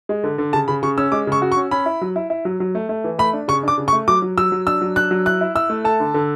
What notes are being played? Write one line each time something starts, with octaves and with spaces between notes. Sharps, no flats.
G#3
D3
D3
C#3 A5
C#3 B5
C#3 C#6
C#4 E6
G#3 D6
C#3 C#6
F#4
C#6
C#4
C#4 B5
E4
F#3
E4
E4
F#3
F#3
A3
A3
E3
A3 B5
D4
C#3 C#6
D4 D6
C#3
C#6
A3
F#3 D6
F#3
F#3 E6
F#3
D4 E6
F#3
D4 F#6
F#3
E4 F#6
E4
E4 E6
A3
A4 A5
D3
D3